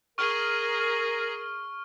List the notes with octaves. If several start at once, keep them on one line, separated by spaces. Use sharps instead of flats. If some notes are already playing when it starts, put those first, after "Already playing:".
G#4 A#4 C#6 F6